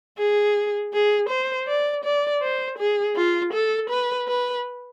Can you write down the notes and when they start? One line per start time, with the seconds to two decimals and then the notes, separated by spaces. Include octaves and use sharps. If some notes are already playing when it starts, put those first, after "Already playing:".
0.18 G#4
0.93 G#4
1.29 C5
1.68 D5
2.04 D5
2.42 C5
2.78 G#4
3.16 F4
3.53 A4
3.90 B4
4.28 B4